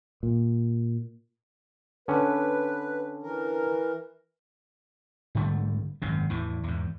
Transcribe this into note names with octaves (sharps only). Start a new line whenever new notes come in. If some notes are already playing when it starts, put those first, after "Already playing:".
A#2
D3 C#4 B4
E3 A#4
G#2 D3 G3 A3
G#1 F#2 C3
E2 A2 E3
E2 G#2